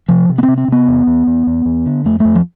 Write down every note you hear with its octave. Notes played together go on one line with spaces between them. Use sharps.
C3 F3
C3
B3
C4
C3
C4
C3 B3
E2
E2
E2
E2
E2
D3
F2 A3
F2 A3
F3